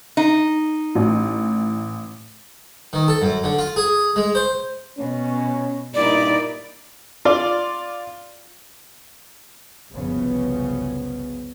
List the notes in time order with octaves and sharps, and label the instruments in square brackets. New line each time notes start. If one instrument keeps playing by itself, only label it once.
[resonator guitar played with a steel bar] D#4
[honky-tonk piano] A1
[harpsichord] D#3
A4
F#2
D3
F4
G#4
G#3
C5
[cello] B2 [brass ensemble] C#4
[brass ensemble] G2 A#2 [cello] D#4 E4 [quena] D5
[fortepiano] F4 D5
[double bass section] F#1 C2 F#2 C#3 F3 B3